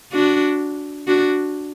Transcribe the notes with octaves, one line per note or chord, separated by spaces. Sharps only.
D4 F#4
D4 F#4